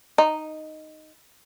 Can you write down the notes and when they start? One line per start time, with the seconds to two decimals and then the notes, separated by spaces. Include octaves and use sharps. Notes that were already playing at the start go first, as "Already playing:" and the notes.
0.18 D#4